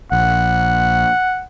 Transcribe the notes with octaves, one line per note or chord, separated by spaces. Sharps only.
A#1 F#5